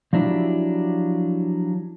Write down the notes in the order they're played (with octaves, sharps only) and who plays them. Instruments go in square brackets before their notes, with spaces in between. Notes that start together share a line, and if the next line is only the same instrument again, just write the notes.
[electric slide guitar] F3 F#3 D4 E4 G4